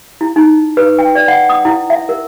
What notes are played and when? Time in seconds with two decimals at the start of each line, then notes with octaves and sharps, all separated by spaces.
0.21 E4
0.36 D#4
0.77 B4
0.99 G5
1.15 D5
1.28 F#5
1.50 D#6
1.65 E4
1.90 E5
2.09 A#4